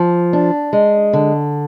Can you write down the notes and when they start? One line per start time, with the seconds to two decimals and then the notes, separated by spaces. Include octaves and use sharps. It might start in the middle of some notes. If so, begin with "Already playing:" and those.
Already playing: F3
0.33 D4
0.73 G#3
1.13 D3